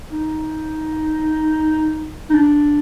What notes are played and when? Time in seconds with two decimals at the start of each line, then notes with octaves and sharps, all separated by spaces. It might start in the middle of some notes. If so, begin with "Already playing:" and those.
0.11 D#4
2.30 D#4
2.34 D4